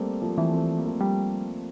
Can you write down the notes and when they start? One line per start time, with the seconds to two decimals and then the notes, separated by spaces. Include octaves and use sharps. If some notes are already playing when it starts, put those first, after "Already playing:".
Already playing: G3 A3 A#3 C4
0.22 F3 A3
0.37 E3 A3 C4
0.53 A3 C4
0.78 A#3
0.86 F3 A3
1.01 G3